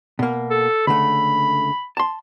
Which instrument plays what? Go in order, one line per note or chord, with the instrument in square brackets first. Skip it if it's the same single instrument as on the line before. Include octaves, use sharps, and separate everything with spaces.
[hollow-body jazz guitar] B2 A#3
[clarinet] A4
[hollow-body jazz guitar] C#2 D3 A3 [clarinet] B5
[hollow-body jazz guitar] A5 C6